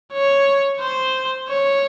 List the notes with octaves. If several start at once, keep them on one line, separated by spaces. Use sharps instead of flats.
C#5
C5
C#5